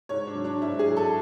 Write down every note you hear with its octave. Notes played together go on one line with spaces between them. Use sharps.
G#2 C#5
D4
F#3
D4
G#2 E4
G#4
F#3
A4